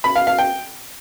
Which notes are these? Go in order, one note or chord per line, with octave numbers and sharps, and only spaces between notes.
B5
F5
F5
G5